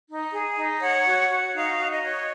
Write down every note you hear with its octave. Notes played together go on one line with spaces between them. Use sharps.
D#4
G#4
D#4
C#5 F#5
F#4
F#4
D#4 F5
F#4
D#5
C#5